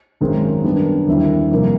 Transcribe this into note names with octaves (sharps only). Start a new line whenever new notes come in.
G#1 F#2 D#3 G#3 C4
F#2 D#3 G3 B3 D4
D#2 D3 G3 C4 E4
F2 C3 D#3 G3 A#3